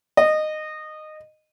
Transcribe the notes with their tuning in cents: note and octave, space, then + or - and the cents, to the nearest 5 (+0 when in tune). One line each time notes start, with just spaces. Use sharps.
D#5 -15